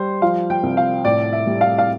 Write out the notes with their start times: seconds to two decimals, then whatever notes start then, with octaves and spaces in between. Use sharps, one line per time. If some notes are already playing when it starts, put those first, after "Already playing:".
Already playing: G3 C5
0.22 F3 F5
0.50 G5
0.63 C2
0.77 F5
1.05 A2 D5
1.33 E5
1.47 G3
1.61 F5
1.78 F5